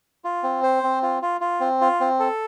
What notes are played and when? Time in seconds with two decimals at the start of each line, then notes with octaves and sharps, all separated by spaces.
0.24 F4
0.43 C4
0.63 C5
0.83 C4
1.03 F4
1.22 F4
1.41 F4
1.60 C4
1.81 F4
2.00 C4
2.20 A4